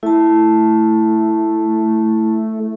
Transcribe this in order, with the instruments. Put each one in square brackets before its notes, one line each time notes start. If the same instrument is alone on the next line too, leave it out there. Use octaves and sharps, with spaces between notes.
[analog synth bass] A3 [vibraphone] E4 A5